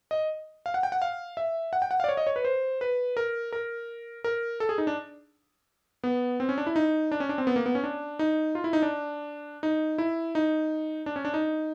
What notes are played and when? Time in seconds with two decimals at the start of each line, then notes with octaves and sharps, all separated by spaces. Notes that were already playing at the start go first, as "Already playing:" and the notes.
0.11 D#5
0.66 F5
0.74 F#5
0.83 G5
0.92 F#5
1.02 F5
1.37 E5
1.73 F#5
1.82 G5
1.91 F#5
2.00 F5
2.04 D5
2.09 C#5
2.17 D#5
2.27 C#5
2.36 B4
2.45 C5
2.81 B4
3.17 A#4
3.53 A#4
4.24 A#4
4.60 A4
4.69 G#4
4.78 D#4
4.87 D4
6.04 B3
6.40 C4
6.49 C#4
6.58 D4
6.67 E4
6.76 D#4
7.12 D4
7.20 C#4
7.29 D4
7.38 C4
7.47 B3
7.56 A#3
7.66 B3
7.75 C#4
7.84 D4
8.19 D#4
8.55 F4
8.64 E4
8.73 D#4
8.83 D4
9.63 D#4
9.98 E4
10.35 D#4
11.06 D4
11.16 C#4
11.25 D4
11.34 D#4